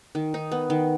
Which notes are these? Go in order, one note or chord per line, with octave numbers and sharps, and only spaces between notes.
D#3
D#4
B3
D#3